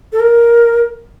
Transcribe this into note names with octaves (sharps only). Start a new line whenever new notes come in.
A4
A#4